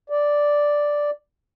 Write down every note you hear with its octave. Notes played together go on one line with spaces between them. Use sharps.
D5